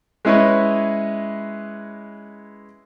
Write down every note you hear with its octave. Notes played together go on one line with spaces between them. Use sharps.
G#3 C#4 E4 B4 C#5 D#5